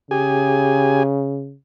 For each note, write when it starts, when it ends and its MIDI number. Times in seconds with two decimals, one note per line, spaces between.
0.11 1.55 49
0.11 1.03 67
0.11 1.03 68
0.11 1.03 80